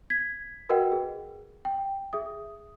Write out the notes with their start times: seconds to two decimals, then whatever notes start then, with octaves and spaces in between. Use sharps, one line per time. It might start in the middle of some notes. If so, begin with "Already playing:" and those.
0.10 G#6 B6
0.69 F#4 A#4 B4 D#5 F#5 G5
0.92 G#4
1.65 G5
2.13 G#4 E5 D#6